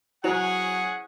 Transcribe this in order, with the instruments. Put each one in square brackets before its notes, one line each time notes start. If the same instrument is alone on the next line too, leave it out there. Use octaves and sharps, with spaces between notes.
[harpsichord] F#3 [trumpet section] C#4 G#4 F#5 [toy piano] E4 C5 G#5